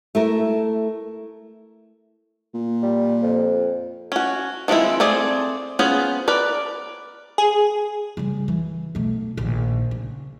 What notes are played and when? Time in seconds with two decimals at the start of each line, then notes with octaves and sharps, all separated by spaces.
0.15 A3 E4 A#4
2.54 A#2
2.82 G3
3.23 F2
4.12 C#4 F#4
4.68 D#3 F3 G#3 C4 E4
5.00 A3 C4 G#4 D5
5.79 B3 C#4 F4 G#4 C5
6.28 A#4 B4 D5
7.38 G#4
8.17 C#3 G3
8.48 E3
8.95 B1 A3
9.37 A#1 D#3
9.91 C#3